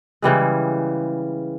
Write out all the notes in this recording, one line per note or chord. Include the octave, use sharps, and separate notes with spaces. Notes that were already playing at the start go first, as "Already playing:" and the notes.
C#3 E3 G3 G#3